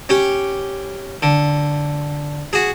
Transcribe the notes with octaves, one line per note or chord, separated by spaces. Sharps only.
C#4 G4
D3
F#4 G#4